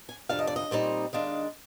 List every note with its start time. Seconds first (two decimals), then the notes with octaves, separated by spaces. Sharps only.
0.09 G#5
0.29 F2 C3 G3 D4 F5
0.39 D#5
0.47 D5
0.56 D#5
0.71 A#2 G3 C4 D#4
1.13 D#3 G#3 D4 F5